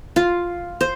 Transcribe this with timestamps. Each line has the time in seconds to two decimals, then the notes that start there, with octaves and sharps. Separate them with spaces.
0.16 F4
0.81 C5